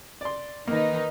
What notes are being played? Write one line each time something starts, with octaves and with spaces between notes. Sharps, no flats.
D5 C6
D#3 A#3 D#4 B4